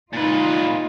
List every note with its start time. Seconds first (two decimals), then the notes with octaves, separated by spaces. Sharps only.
0.13 A#2 D#4 F4 B4